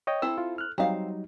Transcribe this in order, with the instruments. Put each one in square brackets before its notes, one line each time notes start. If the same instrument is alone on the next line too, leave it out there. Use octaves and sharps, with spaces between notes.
[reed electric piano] C#5 D#5 G5
[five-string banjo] C4 E4 A4 [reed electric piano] E6
[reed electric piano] F4
F6 F#6
[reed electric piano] F#3 G3 D#4 [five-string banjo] C4 F5